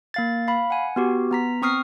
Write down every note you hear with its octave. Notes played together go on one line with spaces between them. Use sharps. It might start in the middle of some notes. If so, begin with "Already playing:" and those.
A#3 F5 A6
F5 B5
F#5 G#5
B3 F#4 G4
B3 A#5 B6
C4 C#6 D#6 F6 C7